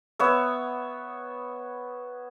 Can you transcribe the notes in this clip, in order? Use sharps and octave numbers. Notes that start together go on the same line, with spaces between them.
B3 C#5 E5